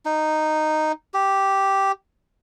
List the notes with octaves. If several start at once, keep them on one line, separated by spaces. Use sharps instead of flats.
D#4
G4